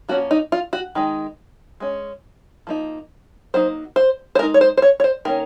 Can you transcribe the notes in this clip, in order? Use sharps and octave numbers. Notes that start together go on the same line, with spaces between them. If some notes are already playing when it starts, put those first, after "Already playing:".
F3 A#3 C#4 F#4
D#4
F4
F#4
D#3 G#3 D#4
G#3 C#4
F3 A#3 D#4
F#3 A#3 D#4 C5
C5
C5
G#3 D#4 A#4
C#5
C5
C5
C#5
C#5
C5
D#3 A#3 C#4 A#4